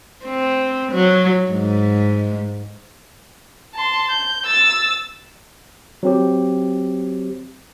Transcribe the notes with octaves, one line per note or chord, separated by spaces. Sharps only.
C4
F#3
G#2
A5 C6
G6
E6 A6
F#3 C4 G4